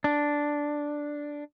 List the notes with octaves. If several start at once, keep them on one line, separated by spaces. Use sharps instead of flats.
D4